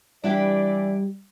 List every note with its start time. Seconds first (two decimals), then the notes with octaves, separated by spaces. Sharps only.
0.24 E3 G3 D4 E4 G4 D5